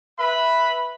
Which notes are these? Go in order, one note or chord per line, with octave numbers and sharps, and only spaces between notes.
B4 E5 B5